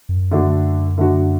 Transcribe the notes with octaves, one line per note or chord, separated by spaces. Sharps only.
F#2
D3 A3 D4 F#4
D3 A3 D4 F#4